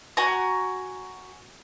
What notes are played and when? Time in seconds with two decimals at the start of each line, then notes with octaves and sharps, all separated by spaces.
0.17 F#4 G#5 A#5